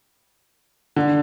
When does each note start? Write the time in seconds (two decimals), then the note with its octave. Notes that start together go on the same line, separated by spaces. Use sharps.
0.96 D3